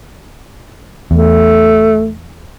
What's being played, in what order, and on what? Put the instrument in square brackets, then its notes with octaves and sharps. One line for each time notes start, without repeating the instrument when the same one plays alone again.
[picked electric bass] E2 [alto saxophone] A3